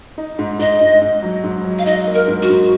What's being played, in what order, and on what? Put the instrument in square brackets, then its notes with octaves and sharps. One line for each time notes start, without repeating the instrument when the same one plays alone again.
[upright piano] D#4
G#2
[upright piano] G#2 [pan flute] D#5
[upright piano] G#2
G#2
F#3
G#2
F#3
[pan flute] F5
[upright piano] D#4 [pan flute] D#5
[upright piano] A#3
[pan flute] A#4
[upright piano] G#2
[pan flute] F#4
[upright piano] G#2